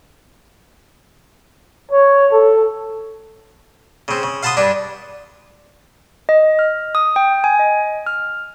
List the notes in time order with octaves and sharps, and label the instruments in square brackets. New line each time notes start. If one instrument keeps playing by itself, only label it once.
[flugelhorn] C#5
A4
[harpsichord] C#3 C4
C#3
F5 F#5 A5 B5 C6 D#6
G2 D4 B4
[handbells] D#5
F6
D#6
G5
G#5
D#5
F6